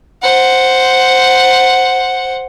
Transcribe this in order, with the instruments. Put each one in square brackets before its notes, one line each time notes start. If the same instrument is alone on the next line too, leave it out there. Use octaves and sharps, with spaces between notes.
[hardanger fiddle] C5 F#5